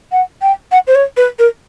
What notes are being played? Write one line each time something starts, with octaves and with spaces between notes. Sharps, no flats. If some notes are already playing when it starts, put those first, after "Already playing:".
F#5
G5
F#5
C5
C#5
B4
A#4